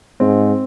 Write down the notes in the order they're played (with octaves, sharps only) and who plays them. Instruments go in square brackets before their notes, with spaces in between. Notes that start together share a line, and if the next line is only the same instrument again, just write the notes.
[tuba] G#2 [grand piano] C4